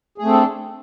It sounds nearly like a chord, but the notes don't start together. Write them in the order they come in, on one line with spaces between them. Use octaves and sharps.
G#4 A3 C4 A4 D4